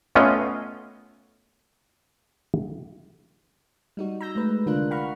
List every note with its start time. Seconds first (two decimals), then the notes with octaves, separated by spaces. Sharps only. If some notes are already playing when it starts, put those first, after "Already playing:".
0.15 A3 B3 C#4 F4 D#5 F5
3.97 G3 D#4 F#4
4.21 A#5 E6 G6 A#6
4.35 G#3 A3 B4
4.66 C2 D3 D4 F4 A#4 F#6
4.91 F5 F#5 A#5 B5 C#6 F6